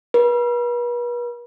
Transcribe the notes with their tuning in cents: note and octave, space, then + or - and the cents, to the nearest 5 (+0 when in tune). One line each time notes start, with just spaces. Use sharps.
B4 -40